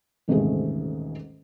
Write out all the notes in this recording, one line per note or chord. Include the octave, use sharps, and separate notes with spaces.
D#1 A1 G#2 C3 A3 G#4